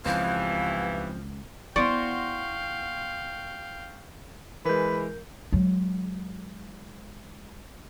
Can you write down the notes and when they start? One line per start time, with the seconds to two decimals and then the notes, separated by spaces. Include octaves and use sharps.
0.06 C#2 G2 E3 F3 C4 F5
1.76 B3 E4 F#4 C5 D5 F5 G5
4.65 E3 G#3 A#4 B4 G6
5.52 F#3 G#3